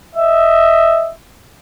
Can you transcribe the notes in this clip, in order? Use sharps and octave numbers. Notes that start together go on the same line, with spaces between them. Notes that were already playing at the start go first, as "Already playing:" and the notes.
D#5 E5